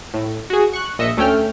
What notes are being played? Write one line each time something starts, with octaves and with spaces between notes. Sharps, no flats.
A2
F#4 G#4
C#6 F#6
A#1 D#5 E5 C#7
D2 A3 C#4 G5 F6